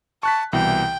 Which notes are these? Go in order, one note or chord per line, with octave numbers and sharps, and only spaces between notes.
A5 C#6 F#6 B6
C2 B2 E3 G5